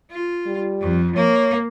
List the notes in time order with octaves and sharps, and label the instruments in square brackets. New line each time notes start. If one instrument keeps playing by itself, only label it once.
[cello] F4
[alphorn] G3
[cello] F2
[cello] A#3 [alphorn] C#5